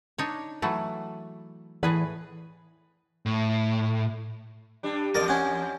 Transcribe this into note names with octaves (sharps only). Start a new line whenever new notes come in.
D4 D#4 C#5
E3 F#3 A3
A2 E3 G#4 B4
A2
G2 G3 D4
E2 A#4 D5 D#5
C#4 F#5